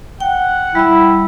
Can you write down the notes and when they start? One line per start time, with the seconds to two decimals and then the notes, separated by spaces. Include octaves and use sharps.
0.20 F#5 G5
0.75 G3 E4 E6